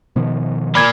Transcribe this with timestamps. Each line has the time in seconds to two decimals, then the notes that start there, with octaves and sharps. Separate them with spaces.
0.16 B2 D#3 F3
0.75 A#3 D5 B5 D6 G#6